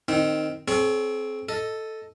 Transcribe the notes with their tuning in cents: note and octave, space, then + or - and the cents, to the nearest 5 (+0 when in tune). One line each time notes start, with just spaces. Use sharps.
D#3 -10 C4 +0
C4 +0 G#4 +45 C#5 +0
A4 +0 D#5 +5